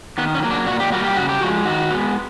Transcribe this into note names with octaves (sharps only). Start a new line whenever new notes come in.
D#3 B3
C#4
F#3 A#3
D4
A#2 F#4
G4
G3 A#3 F#4
G4
C#3 F#4
G4
F3 G#3 F#4
D#3 F#4
G#3 B3